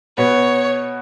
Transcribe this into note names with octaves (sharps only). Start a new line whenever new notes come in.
B2 B3 C#5